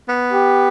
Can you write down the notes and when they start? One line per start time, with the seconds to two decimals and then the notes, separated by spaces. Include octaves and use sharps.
0.08 B3
0.33 G4